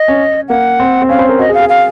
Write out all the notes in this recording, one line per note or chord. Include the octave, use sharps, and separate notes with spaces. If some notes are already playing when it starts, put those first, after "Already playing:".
Already playing: D#5
C#4
A#3 F#5
C4
C4
C#4 F5
C5
A#4
F#4 D#5
G#4
F5
G#4
F5